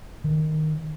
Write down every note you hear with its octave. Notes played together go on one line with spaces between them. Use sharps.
D#3